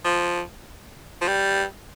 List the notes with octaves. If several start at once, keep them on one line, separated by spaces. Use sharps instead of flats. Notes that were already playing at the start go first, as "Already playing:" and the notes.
F3
F3
G3